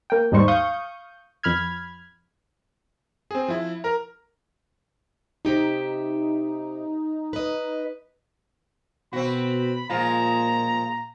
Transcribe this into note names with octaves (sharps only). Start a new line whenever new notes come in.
A#3 G5
D#2 G#2 G3 D#4 C5 C#6
F5 C#6 D#6 G6
F2 B5 F6 G#6
C4 G#4
F3 E4
A#4 A#5
C3 D#4 G4 E5
B4 D#5
B2 C4 F#4 B5
A#2 F3 G#3 F4 A#5